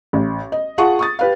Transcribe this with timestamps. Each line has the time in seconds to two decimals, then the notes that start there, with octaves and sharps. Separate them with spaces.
0.13 A1
0.52 D#5
0.78 F4 G#4 F#5 A5 C#6
0.99 C#6 D#6 A6
1.19 G4 B4 F5